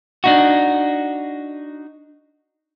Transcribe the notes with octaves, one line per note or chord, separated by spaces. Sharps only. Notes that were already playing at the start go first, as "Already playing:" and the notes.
D4 D#4 F#4